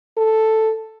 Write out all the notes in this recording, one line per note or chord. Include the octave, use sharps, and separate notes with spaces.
A4